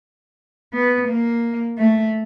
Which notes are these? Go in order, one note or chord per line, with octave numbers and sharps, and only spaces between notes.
B3
A#3
A3